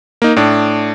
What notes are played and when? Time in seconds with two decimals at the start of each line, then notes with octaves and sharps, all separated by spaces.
0.22 A#3 D#4
0.36 A2 D4